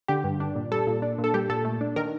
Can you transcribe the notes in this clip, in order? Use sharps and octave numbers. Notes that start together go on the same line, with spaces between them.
D3 G4
G2
D4
A#2
G3 A4
A#2
D4
A#2
A4
G3 G4
A#2 A4
A3
D4
D#3 A#4